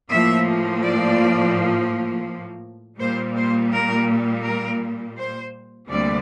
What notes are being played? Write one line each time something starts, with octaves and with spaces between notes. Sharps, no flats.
A2 F3 A#3 E5
D5
A#2 G3 A#3 C5
C5
A#4
A#4
C5
D2 C3 G3 A#3 D5